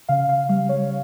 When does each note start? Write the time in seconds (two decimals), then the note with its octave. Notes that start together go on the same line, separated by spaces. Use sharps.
0.09 C#3 F5
0.29 F5
0.49 G3 F5
0.69 C#5